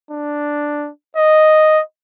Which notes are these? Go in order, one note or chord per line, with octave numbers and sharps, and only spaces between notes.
D4
D#5